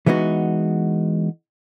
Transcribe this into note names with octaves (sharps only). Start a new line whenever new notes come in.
E3 G#3 B3 D#4 F#4